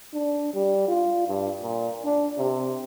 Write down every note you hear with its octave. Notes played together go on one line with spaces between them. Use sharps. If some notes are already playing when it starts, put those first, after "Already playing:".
D4
G3
F4
G2
A#2
D4
C3